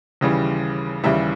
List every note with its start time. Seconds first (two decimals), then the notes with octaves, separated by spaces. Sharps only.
0.21 D#2 C#3 E3 G3
1.04 D#2 C#3 E3 G3 E5